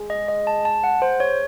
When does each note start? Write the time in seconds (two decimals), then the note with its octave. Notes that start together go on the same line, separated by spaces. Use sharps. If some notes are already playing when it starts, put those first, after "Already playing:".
Already playing: G#3
0.10 D#5
0.28 D#5
0.47 A5
0.65 A5
0.84 F#5
1.02 C5
1.20 C#5